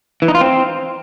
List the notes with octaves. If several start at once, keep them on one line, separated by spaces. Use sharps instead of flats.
E3
D#4
F4
C4